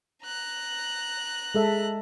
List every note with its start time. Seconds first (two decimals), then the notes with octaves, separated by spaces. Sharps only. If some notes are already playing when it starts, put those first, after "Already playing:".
0.24 A#5 F#6
1.55 G#3 A4 E5